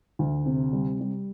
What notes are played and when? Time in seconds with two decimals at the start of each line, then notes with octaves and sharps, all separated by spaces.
0.19 D2
0.46 C3
0.73 G3
1.00 G3